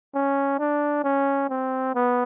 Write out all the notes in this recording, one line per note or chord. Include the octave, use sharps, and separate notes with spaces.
C#4
D4
C#4
C4
B3